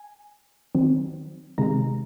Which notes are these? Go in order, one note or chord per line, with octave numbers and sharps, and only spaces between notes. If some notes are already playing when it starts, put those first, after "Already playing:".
Already playing: G#5
D#3 F#3 C4
C3 D#3 G#3 A#5